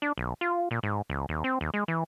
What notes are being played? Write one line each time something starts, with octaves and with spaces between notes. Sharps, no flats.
D4
B1
F4
A#2
G#2
C#2
D#2
C4
D#2
G#3
E3